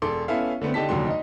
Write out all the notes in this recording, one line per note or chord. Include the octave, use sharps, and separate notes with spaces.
E1 A4 C6 D6
B3 C#4 E4 A4 E5 F5
D3 A3 B3 C4
D3 D#4 G4 A5 B6
F1 D#2 D3 F#3 C6
D#4 D#5